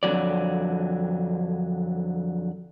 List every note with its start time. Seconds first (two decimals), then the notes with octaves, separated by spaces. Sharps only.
0.03 F2 D3 D#3 F#3 D5